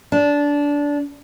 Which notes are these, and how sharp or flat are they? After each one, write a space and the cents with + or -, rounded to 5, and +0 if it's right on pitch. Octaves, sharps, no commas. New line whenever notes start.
D4 -20